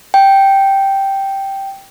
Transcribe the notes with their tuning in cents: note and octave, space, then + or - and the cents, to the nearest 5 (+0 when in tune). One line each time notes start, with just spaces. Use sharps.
G5 -5